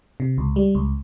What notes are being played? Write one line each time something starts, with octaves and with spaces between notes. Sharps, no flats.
C3
C#2
G3
C#2